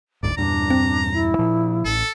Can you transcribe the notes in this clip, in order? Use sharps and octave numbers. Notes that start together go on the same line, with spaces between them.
F#1 D2 G#2 D5
E2 G2 A#2 D4 A#5
C4
E4
A#2 F3
A1 A2 A4